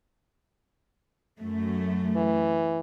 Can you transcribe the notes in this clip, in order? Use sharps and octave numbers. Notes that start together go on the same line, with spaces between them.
F#2 A3
E3